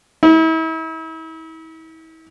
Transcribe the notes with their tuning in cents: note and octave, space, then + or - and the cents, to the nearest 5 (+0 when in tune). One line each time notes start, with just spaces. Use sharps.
E4 -40